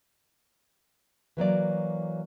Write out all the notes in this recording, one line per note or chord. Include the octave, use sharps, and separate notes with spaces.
E3 F#3 A#3 D5